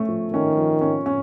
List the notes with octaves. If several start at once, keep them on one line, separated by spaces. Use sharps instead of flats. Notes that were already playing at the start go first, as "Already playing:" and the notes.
Already playing: A3 C#4
F3
D#3 C#4
F3
C#4
C#4